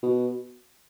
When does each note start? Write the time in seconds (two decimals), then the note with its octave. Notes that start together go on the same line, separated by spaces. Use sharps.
0.03 B2